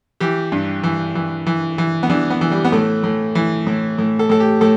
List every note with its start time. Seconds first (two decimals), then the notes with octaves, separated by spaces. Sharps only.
0.20 E3 G4
0.52 G2
0.83 E3
1.15 E3
1.47 E3
1.78 E3
2.03 B3
2.10 E3 D4
2.30 B3
2.41 E3
2.51 G3
2.65 B3
2.72 A2 A3
3.04 A2
3.35 E3
3.67 A2
3.98 A2
4.19 A4
4.29 A2 A4
4.40 G4
4.61 A2 A4